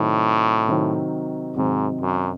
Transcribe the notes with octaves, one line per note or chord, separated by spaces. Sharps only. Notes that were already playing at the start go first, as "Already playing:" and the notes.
Already playing: A2 C3 D#3 F#3 C4 D#4
C3 D#3 F#3 C4 D#4
G#2 C3 D#3 F#3 C4 D#4
F#2